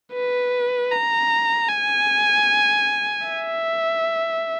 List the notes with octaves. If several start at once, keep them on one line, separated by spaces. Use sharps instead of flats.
B4
A#5
G#5
E5